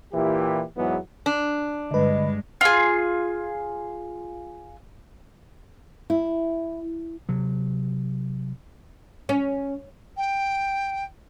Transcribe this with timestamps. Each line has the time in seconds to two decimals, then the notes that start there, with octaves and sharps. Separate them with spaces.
0.13 A#2 E3 E4 G4
0.77 E2 G#2 E3 F#3 B3
1.26 D4
1.91 G2 D3 G#3 B4 D#5
2.61 F4 G#4
6.10 E4
7.29 C3 F#3
9.29 C#4
10.17 G5